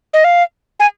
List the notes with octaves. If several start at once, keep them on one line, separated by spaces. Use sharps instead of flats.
D#5
F5
G#5